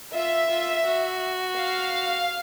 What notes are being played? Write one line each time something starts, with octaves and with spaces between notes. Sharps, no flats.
F4 E5
F4
F#4
F5